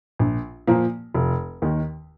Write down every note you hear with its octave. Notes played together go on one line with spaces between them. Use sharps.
A#1
A#2 F3 A#3
F1
D#2 D#3